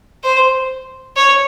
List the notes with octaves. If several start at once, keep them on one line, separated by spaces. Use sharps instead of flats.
C5
C#5